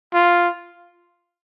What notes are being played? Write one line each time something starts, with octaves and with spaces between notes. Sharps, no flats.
F4